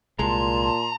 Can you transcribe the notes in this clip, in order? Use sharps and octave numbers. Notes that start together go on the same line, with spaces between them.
C2 A#2 G#3 A5 A#5 C6